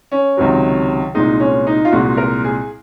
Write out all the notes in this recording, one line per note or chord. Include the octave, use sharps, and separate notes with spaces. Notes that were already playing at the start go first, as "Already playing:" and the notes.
C#4
C#2 C3 D#3 F#3
C2 A#2 G#3 D#4
C#4
D#4
F4
C2 A#2 G#3 F#4
A#4
G#4